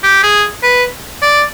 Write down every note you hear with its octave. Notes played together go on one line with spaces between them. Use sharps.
G4
G#4
B4
D5